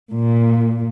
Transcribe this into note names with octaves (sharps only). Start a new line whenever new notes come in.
A#2